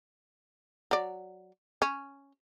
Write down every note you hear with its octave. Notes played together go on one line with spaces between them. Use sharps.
F#3 D5
C#4